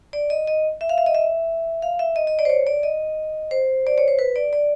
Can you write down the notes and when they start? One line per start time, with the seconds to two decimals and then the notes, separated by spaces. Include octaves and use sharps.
0.13 D5
0.30 D#5
0.47 D#5
0.81 E5
0.89 F5
0.98 E5
1.06 D#5
1.15 E5
1.82 F5
1.99 E5
2.16 D#5
2.27 D#5
2.39 D5
2.45 C5
2.50 C#5
2.67 D5
2.83 D#5
3.51 C5
3.87 D5
3.98 C#5
4.08 C5
4.19 B4
4.36 D5
4.53 D5